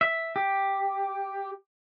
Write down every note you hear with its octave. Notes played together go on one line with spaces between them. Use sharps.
E5
G4